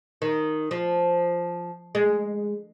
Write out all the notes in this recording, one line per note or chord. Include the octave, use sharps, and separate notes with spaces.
D#3
F3
G#3